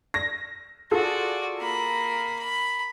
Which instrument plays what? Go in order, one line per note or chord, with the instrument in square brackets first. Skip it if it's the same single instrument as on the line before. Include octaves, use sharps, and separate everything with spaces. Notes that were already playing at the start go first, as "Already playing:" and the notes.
[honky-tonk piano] A#6
[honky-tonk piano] F4 G#4 A4 [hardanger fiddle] F#4 D5
[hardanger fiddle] A#3 B5
B5